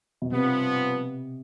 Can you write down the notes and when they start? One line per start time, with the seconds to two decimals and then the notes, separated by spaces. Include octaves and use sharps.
0.22 B2
0.31 G2 C3 F3 B3